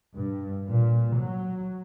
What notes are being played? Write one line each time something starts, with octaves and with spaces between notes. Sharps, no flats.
G2
A#2
F#3